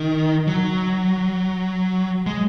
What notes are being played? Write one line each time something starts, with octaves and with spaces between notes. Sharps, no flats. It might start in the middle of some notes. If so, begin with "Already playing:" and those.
Already playing: D#3
F#3
G#3